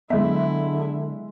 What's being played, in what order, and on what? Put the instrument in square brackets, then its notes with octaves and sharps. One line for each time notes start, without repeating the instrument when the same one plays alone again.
[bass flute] D3 [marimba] F#3 B3 [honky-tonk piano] G#3 E5 [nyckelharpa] E4